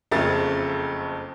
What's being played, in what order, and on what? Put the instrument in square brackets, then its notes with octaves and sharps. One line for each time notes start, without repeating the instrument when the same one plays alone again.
[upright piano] F#1 F2 C#3 A3 A6